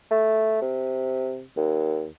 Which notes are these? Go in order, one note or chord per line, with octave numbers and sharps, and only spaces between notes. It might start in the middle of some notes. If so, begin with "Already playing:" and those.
A3
C3
D#2